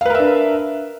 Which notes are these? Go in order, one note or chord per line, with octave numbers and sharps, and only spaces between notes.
D4 A#4 B4 E5 F5